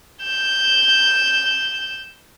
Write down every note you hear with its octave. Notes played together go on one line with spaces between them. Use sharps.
G6 E7